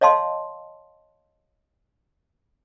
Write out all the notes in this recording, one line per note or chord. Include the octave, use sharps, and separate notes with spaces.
C#5 D#5 F5 A5 C6